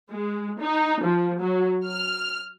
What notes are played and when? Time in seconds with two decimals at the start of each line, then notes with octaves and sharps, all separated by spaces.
0.11 G#3
0.61 D#4
1.03 F3
1.41 F#3
1.86 F6